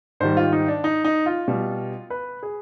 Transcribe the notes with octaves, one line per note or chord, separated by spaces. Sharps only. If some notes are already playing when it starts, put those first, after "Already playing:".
G#2 D#3 G3 C5
F4
D#4
D4
D#4
D#4
F4
B2 G3
B4
G#4